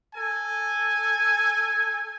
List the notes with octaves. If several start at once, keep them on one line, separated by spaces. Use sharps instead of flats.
A4 G#5